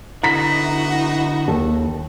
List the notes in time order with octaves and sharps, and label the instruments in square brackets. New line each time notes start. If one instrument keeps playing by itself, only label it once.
[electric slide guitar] D3 E4 [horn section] B3 D#4 F#4 [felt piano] A#5 B6
[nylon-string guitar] D#2 A4